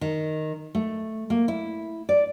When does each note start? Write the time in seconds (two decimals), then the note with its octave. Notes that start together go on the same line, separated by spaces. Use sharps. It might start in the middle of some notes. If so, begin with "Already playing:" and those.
0.01 D#3
0.75 A3
1.30 A#3
1.48 E4
2.09 D5